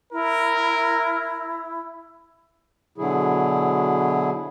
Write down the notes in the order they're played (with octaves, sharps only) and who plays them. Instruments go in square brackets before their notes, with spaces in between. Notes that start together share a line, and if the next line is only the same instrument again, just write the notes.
[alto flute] E4 [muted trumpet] A#4
[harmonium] B2 D3 F#3 E4 G#4